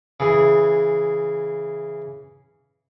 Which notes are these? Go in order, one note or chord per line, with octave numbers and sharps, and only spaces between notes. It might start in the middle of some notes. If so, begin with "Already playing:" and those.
C#3 E3 G#4